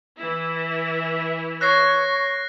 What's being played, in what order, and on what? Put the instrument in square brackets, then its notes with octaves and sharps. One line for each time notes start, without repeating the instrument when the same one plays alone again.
[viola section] E3 E4
[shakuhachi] C#5 [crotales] F#6 A#6 C7